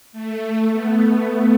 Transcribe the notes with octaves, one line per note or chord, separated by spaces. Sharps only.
A3
B3